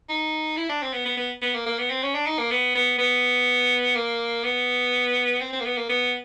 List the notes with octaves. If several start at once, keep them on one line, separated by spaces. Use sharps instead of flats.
D#4
E4
D4
C4
B3
B3
B3
B3
A#3
A#3
B3
C4
C#4
D4
D#4
A#3
B3
B3
B3
A#3
B3
C4
C4
A#3
B3
A#3
B3